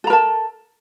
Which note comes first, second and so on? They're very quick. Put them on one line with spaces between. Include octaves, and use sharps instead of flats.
A4 A#5 A#4 A5